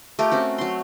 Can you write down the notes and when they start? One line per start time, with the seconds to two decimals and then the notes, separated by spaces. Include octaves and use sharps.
0.19 A3 F4 G4 A#4
0.32 C4 C#4 F#4
0.58 F#3 C6